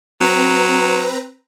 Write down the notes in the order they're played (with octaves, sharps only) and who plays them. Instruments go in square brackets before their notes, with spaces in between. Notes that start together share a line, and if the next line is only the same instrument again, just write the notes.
[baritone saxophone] F#3 [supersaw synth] C4 B4 A#5